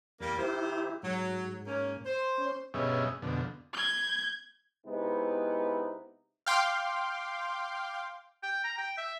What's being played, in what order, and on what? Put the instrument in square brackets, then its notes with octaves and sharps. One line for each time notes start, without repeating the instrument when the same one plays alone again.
[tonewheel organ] E2 [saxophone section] G3 A#3
[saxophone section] D#3 A#4 C5 [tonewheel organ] E4 G4
[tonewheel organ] G#2 [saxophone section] F#3
[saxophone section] A#3 C#4
C5
[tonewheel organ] C#4
[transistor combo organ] G2 B2 C#4 G#4 D#5 E5
F2 B2 D3
[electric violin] G6 G#6
[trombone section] C3 G#3 B3 D#4 E4
[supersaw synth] F5 G5 C6 D6
[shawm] G5
A#5
G5
E5